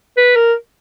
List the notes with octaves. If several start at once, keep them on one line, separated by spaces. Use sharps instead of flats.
B4
A#4